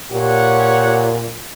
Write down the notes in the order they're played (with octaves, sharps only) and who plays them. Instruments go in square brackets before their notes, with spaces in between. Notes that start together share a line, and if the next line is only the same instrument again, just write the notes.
[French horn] A#2 [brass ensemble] G4 C#5 F#5